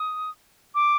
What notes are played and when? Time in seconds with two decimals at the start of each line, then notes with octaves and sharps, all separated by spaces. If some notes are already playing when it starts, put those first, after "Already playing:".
Already playing: D#6
0.75 D6